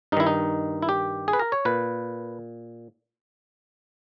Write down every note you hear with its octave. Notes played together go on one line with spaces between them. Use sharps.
G2 D#3 D#4 E4
D#4
E4
G4
G#4
B4
A#4
C#5
A#2 B4